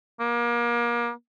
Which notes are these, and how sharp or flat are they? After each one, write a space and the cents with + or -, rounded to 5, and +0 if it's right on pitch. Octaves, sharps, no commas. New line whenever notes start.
A#3 +30